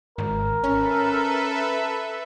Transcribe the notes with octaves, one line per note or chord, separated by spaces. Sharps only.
G#1 A#4
C#4 A4 B4 E5